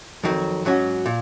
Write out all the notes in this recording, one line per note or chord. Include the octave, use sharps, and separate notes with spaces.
F2 D#3 F#3
G#2 F#3 C#4 F#4
A#2